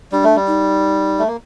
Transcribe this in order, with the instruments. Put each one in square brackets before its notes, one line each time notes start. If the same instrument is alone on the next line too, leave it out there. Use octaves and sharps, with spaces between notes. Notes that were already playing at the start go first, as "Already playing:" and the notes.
[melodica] G3 [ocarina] D4
[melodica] A3
G3
[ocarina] D#4
[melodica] A3
A#3